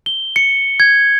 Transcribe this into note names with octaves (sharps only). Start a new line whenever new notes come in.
G7
C#7
G#6